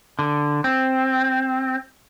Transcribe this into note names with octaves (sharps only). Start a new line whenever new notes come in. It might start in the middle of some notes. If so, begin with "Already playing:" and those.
D3
C4